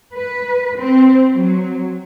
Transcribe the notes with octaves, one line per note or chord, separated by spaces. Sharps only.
B4
C4
F#3